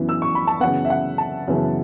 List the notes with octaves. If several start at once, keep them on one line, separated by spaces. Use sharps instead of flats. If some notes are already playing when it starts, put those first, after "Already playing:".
Already playing: F#2 E3 B3 E4
E6
C#6
B5
A5
F#2 C#3 E3 B3 F#5
E5
F#5
A5
F#2 C#3 E3 B3